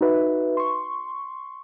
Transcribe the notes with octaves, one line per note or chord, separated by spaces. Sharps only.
D#4 F#4 B4 E5
C6 C#6